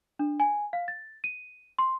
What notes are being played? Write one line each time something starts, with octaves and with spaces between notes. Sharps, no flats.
D4
G#5
F5
A6
D#7
C6